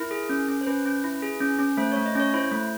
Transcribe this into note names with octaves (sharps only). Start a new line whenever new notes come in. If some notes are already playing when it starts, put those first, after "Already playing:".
Already playing: E4 A#4
G#4
C#4
C#4
C5
C#4 B4
C#4
E4
G#4
C#4
C#4
A3 C5
A3 C#5
D#5
C#4 C#5
E4 C5
A3